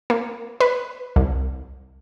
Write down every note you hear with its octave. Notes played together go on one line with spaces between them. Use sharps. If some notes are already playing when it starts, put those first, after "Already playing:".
A#3
B4
C2